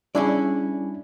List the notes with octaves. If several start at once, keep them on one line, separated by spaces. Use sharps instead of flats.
G3 C#4 D4 E4 G#4 D5